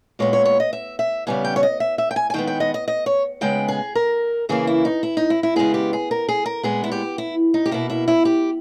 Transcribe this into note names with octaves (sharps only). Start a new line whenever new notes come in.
A#2 G#3 B3 C#5
C#5
C#5
D#5
E5
E5
C#3 G3 B3 G#5
G5
C#5
D#5
E5
E5
G5
G#5
G#5
D#3 G#3 B3 G5
G5
D#5
D#5
D#5
C#5
C#3 G#3 B3 G5
G#4
A#4
C#3 E3 A#3 G#4
E4
D#4
E4
D#4
E4
E4
C#3 G#3 B3 G#4
G4
G#4
A#4
G#4
A#4
A#2 G#3 B3 G#4
E4
G4
E4
D#4
G4
B2 A#3 E4
E4
E4
G4